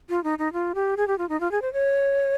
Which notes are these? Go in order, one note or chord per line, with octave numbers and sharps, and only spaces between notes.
F4
D#4
D#4
F4
G4
G#4
G4
F4
D#4
F4
G#4
C5
C#5